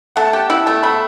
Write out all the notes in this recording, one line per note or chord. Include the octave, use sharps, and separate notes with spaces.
A3 F#5
A5
G4 G5
E4 G5
A3 A5
A3 B5